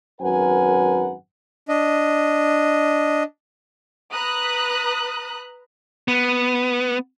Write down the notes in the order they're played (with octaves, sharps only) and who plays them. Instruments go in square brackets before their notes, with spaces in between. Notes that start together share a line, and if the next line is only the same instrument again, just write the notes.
[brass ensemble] G#1 F#2 A#4 B4 F#5 G#5
[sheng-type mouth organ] D4 D#5
[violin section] B4 A#5 D#6 F#6
[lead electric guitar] B3